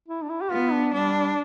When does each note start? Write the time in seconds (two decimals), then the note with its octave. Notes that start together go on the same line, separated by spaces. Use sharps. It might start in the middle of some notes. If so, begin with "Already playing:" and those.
0.08 E4
0.23 D4
0.30 E4
0.41 G4
0.51 B3 F4
0.72 D4
0.94 G3 D4